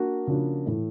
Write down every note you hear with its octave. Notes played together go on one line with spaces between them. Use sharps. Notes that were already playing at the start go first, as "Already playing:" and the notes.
Already playing: A#3 D4 F#4
C#3 F3 A#3 D4 F#4
A2 E3 A3